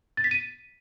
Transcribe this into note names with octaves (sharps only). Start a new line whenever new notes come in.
A6
B6
D#7